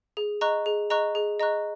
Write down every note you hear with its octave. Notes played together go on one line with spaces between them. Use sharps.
G#4
D#5 A#5 C#6 F#6
G#4
D#5 A#5 C#6 F#6
G#4
D#5 A#5 C#6 F#6